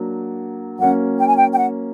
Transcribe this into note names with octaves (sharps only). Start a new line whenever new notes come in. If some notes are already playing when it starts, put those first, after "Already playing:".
Already playing: F#3 A#3 D4
F#3 A#3 C#4 F#5
G5
G#5
G5
G5
F#5